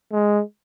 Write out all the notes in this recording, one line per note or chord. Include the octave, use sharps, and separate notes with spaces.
G#3